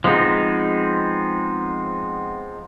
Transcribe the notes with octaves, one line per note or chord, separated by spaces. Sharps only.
F3 G#3 B3 C4 D#4